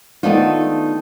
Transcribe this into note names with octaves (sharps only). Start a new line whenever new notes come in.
D#3 A3 B3 D4 D#4 F4